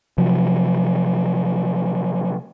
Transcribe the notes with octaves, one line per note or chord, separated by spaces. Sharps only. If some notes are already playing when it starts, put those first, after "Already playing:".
C3 F3 F#3